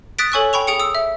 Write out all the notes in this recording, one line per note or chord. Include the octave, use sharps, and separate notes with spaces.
D#6 F#6 A6 B6 D7
A4 C#5 G#5 C#6 E6 F#6
G5 B5 C#6 F7
G#4 G5 D#6 C#7
D#6 E6
E5